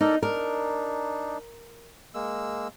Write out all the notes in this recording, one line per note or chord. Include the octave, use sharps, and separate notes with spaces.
D#4 A4 A#4 D5
D4 D#4 A#4
G#3 A#3 E6